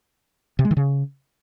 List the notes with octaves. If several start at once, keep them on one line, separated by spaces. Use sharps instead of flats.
C3
G#3
D#3
C#3